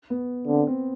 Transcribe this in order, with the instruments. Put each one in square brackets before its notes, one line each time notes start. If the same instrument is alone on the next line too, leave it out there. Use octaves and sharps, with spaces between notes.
[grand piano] B3
[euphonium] D3 [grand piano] C4
[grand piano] C4